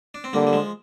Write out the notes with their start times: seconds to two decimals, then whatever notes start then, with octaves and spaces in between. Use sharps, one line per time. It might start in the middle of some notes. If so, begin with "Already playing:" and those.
0.14 D4
0.24 C4
0.33 D3 G3 A#3
0.47 G3
0.53 F3 G#3